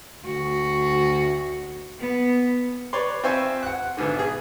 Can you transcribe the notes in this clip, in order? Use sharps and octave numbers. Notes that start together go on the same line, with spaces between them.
D2 F#4
B3
B4 C#5 D5 C6
C4 F4 C5 E5 G#5 C#6
F#5 F#6
G#1 G#2 B2 D3
G#4